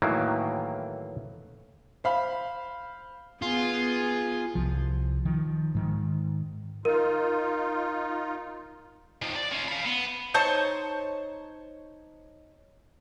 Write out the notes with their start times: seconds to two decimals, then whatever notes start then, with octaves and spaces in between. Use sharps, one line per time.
0.02 A2 D#3 E3 F#3 A#3
2.04 C5 F5 B5
3.42 B3 F4 G#4
4.55 C2 F3
5.25 D#3 F3
5.75 G#2 D#3
6.85 D#4 F4 A#4
9.22 D#3 F3
9.36 D5
9.52 C#4 F4
9.68 F5 B5
9.86 B3
10.34 D#4 C5 C#5 A5